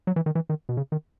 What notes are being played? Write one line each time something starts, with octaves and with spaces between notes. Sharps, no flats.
F#3
E3
D#3
E3
D#3
B2
C#3
D#3